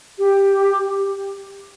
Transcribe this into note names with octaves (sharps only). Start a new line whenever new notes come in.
G4